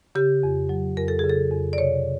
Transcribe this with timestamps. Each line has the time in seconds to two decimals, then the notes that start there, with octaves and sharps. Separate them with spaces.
0.15 C#3 G4
0.43 F2
0.69 F#3
0.97 F2 A#4
1.08 A4
1.19 C#3 G#4
1.30 A4
1.51 F2
1.73 D5
1.78 C3 C#5